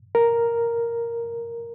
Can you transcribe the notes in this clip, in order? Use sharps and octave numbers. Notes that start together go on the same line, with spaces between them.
A#4